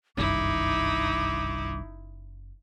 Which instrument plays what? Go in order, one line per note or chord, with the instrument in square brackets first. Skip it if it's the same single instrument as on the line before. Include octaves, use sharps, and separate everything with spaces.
[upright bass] F#1 [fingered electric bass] C2 G2 D#3 [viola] D#4 E4 [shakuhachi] D6